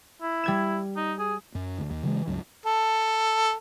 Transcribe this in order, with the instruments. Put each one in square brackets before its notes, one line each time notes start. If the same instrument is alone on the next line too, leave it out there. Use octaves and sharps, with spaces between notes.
[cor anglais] E4
[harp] G3 G#6 E7
[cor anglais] D#4
G#4
[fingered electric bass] F#2
D2
D#2
C#3 E3 F#3 G#3
C#2 G2 F#3
[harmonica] A4